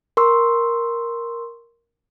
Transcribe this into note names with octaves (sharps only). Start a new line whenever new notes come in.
A#4 C6 C#6 E6